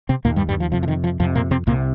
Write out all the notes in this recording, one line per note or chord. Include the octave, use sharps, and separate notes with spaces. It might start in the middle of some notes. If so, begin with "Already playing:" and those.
C3 C4
D#2 A#2 A#3
G2 G3
G2 G3
F3
F2 C3 F3
F3
D#3
F3
F2 C3 F3
A#2 A#3
C3 C4
C2 A#2 C3 A#3